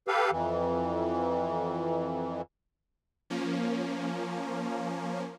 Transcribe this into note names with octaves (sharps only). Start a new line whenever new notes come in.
G4 A4 B4 F5
F2 E3
F3 A#3 C#4